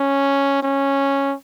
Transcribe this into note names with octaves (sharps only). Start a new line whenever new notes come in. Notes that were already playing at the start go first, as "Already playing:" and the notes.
Already playing: C#4
C#4